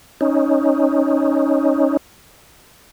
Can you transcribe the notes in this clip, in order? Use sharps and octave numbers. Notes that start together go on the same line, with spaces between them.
C#4 D#4